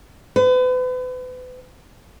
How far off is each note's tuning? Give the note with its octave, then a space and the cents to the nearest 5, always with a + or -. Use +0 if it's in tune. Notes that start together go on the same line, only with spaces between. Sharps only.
B4 +40